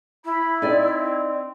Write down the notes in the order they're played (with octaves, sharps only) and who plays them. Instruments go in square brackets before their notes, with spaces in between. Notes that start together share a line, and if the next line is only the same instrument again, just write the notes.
[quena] E4 [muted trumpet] B5
[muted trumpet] C4 [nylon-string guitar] D#4 D5